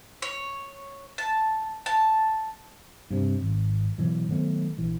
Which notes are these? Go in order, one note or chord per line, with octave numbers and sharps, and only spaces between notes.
C#5
A5
A5
G2 C3
G#1
B2 E3 F#3
D#3 F#3 A3 B3
A#1 E3